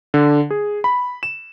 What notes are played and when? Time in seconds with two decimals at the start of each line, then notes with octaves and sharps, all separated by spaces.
0.14 D3
0.51 G#4
0.84 B5
1.23 E7